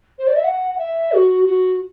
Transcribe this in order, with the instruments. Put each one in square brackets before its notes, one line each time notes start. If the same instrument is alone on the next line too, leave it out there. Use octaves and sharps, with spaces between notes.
[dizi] C5
D5
E5
F#5
F#5
E5
F#4
F#4